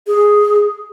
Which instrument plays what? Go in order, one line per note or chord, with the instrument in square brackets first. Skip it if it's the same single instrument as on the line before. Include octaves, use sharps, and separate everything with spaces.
[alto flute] G#4